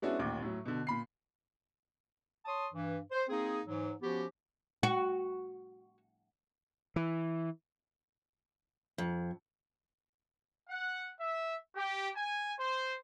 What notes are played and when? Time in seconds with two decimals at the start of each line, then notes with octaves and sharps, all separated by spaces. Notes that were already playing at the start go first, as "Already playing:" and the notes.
0.02 G#3 B3 C#4 D4 E4 F#4
0.19 A1 D#2 A#2 D6
0.42 A2 F#3
0.65 B2 D3
0.87 A#2 B5 C7
2.46 C#5 A5 C6 D#6
2.73 G2 E3
3.12 C5
3.29 A#3 C4 D#4 G#4
3.66 G#2 E3 F#3
4.02 F3 B3 C#4 F#4 G4
4.83 F#4
6.96 E3
8.98 F2
10.70 F#5
11.19 E5
11.75 G4
12.16 G#5
12.60 C5